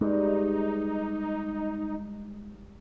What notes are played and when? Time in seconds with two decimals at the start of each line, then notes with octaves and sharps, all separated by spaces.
0.01 G2 G#3 D#4